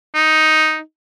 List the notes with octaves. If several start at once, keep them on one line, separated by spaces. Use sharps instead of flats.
D#4